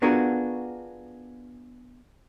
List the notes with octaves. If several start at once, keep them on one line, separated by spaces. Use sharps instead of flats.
B3 D4 F4 F#4 G#4 A#4